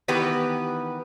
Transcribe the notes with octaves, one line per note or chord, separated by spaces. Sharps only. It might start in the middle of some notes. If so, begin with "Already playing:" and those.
D#3 E3 B3 G4 B4